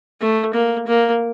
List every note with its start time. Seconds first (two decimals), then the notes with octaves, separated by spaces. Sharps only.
0.21 A3
0.54 A#3
0.87 A#3